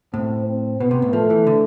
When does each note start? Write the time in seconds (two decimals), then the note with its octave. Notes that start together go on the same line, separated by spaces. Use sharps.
0.13 A2 C4
0.46 C4
0.80 B2 B3
0.91 C3
1.02 A2
1.13 F3 A3
1.30 E3
1.47 D3